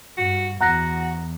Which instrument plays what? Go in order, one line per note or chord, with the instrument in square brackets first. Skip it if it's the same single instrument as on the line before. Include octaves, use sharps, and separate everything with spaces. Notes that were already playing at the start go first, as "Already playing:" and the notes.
[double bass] G2 [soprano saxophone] F#4
[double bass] E2 [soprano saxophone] F#4 [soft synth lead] F#5 [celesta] A#5 F#6 A#6